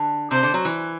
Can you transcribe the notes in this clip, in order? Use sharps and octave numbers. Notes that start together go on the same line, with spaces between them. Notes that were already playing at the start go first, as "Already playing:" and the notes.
Already playing: D3
C3 C5
D3
F#3
E3